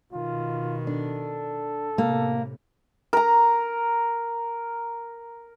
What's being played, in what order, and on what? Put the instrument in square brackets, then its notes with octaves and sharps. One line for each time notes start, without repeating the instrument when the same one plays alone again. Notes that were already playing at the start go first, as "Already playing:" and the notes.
[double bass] B2 D#3 [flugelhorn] F4
[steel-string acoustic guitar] D4 [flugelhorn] A4
[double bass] A2 C3 [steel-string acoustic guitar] A#3
[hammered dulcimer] A#4 A#5